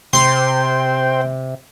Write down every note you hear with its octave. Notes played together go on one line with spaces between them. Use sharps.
C3 C5 G5 C6